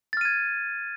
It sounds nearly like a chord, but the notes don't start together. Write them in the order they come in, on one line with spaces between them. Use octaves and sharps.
A6 F6 D#7 G#6